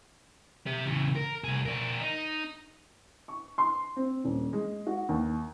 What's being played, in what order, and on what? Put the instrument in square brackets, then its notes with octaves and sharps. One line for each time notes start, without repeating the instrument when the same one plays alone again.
[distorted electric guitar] G4 E5
C#3 E3
A#4
C2 G#4
D4 A#4
D#4
[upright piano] C#6
C6
C4
D#1
G#3
F#4
D#2